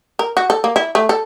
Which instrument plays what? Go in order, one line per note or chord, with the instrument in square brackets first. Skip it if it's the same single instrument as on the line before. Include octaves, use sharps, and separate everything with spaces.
[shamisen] A#4
F#4
A4
A#3
E4
A3
A4